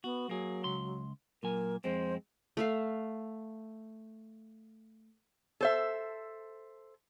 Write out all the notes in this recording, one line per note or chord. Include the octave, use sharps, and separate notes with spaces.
B3 F#4
F#3 A#3 G#4
C#2 C6
A#2 F#3 A#4 G#5
F2 G#3 C4 C5
A3 E5 F5
A4 C5 E5